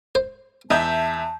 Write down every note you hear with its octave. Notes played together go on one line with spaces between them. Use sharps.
C5
E2 D#4 E5 A5 G6